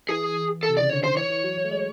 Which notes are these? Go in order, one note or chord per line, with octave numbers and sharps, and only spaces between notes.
E3 G#4
A4
C3
C#3 D5
D3 C#5
D#3 C5
E3 C#5
E3
F#3
F#3
A3
G#3